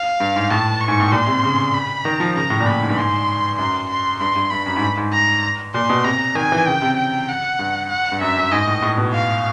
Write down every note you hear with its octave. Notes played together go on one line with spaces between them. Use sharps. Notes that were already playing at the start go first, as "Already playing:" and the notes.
Already playing: F5
G2
G#2
A2 A5
C#6
G#2
A2
A#2 C6
C3
C#3
B5
D#3 A#5
F3
C#3 A#5
A2
A#2
A2 B5
G#2
G2
G#2 C6
F#2 C6
C6
G2 C6
G2
G2 B5
F#2
G#2
G2
G#2
A#5
A#2 C6
B2
C3 A#5
D#3 G#5
E3
C#3 G5
C3
G5
F#5
G2
F#5
G2
F#2 E5
F#2
G#2 D#5
A2
A2
B2
F5